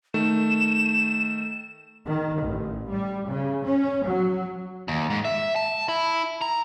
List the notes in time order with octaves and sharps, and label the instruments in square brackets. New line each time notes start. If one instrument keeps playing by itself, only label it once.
[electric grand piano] D#3 A3 [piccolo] E7
[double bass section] D#3
A1
G3
C#3
C#4
F#3
[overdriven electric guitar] D#2
G#2
E5
A5
E4
A#5